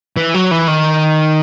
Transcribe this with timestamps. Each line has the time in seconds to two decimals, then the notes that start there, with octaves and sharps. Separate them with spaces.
0.17 E3
0.34 F#3
0.51 E3
0.68 D#3